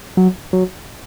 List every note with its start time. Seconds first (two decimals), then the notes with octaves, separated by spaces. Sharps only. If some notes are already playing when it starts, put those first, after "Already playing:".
0.17 F#3
0.53 F#3